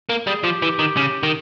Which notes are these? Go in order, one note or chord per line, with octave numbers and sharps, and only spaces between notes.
A#3
G3 G#4
F3 G4
E3
D#3
C#3
D#3